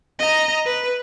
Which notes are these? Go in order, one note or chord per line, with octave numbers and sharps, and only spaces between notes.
D#5 A#5
B4